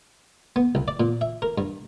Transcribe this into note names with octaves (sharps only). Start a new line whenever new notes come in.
B3
C2
D5
A#2
E5
A#4
G2